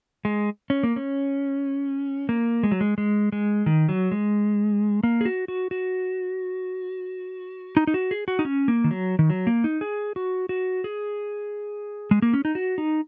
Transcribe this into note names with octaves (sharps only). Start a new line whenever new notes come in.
G#3
C#4
A#3
C#4
A#3
G#3
F#3
G#3
G#3
G#3
D#3
F#3
G#3
A#3
G#4
F#4
F#4
F#4
D#4
D#4
F#4
G#4
F#4
D#4
C#4
A#3
D#3
F#3
D#3
F#3
A#3
D#4
G#4
F#4
F#4
G#4
G#3
A#3
C#4
D#4
F#4
D#4